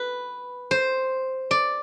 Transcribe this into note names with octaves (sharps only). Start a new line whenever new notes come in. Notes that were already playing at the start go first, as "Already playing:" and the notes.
Already playing: B4
C5
D5